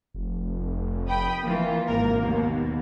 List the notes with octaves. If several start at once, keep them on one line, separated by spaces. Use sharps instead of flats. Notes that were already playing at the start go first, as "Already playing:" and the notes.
F1
G5 B5 D#6
E3 A#3 F4
G#1 C3 A#4
D#2 B2